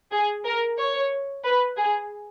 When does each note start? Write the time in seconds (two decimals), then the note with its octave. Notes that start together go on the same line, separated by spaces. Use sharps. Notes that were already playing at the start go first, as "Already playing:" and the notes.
0.12 G#4
0.45 A#4
0.78 C#5
1.44 B4
1.77 G#4